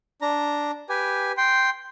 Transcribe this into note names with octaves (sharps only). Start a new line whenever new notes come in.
D4 A#5
G4 B4 G#5
G5 C6